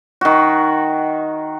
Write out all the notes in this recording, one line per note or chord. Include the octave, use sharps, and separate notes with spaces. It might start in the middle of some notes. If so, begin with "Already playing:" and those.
D#3 F#4